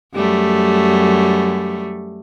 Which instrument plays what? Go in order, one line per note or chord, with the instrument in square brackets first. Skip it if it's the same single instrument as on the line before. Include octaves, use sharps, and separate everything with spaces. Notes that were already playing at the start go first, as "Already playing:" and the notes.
[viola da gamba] F#2 G3 A3